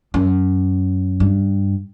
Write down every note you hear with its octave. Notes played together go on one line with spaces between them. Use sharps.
F#2
G2